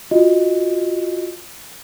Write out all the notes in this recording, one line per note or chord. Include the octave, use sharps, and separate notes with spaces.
F4 F#4 D#5